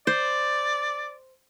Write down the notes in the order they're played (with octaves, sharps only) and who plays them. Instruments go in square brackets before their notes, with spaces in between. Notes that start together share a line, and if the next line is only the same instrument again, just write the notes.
[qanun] C5 [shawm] D5